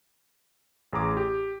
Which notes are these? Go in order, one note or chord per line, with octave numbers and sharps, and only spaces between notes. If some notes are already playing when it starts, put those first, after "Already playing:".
A1 G#4 A#5 D6
G4